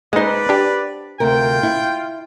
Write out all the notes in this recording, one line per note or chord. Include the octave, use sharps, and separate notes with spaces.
G#3 D#4 B4 C5 D5 F#5
D4 G4
D2 C3 F4 A#4 G5
E4